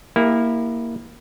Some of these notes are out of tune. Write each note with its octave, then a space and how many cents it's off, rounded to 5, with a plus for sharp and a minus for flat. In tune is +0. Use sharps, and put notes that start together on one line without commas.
A#3 +0 E4 -10 G4 +35